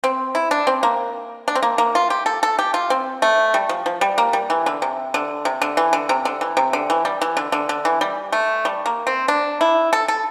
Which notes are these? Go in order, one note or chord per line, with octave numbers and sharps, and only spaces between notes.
C4
E4
D4
C4
A#3
D4
C4
A#3
A#3
F4
G4
A4
A4
G4
F4
C4
A3
G3
F3
F3
G3
A#3
G3
E3
D3
C3
D3
C3
D3
E3
D3
C3
D3
E3
C3
D3
E3
G3
E3
D3
D3
D3
E3
G3
A3
G3
A#3
C4
D4
E4
A4
A4